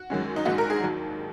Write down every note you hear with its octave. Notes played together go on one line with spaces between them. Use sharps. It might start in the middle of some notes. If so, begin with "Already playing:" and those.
Already playing: F#4
F#2 D#3 G#3 C#4
D#4
A#1 G#2 D#3 G#3 F#4
A#4
G#4
D#2 D#3 F#3